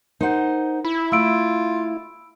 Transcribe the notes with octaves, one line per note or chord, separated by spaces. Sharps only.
D#4 A#4 C5 F#5
E4 B5
A3 F4 B5 E6 D7